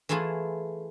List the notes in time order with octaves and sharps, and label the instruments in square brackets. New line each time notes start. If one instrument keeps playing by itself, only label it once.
[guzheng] E3 A3 E4 F4 G#4